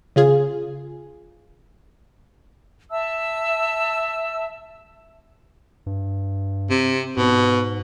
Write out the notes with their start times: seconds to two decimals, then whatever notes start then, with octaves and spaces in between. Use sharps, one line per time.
0.16 C#3 F4 G#4
2.90 E5 A5 E6
5.86 G2
6.70 C3
7.17 G#2 B2